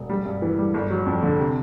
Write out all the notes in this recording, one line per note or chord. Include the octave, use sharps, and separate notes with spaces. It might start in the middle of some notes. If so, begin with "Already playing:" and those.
Already playing: E1
G3
G2
E3
G3
G1
F#3
F2
D3
C3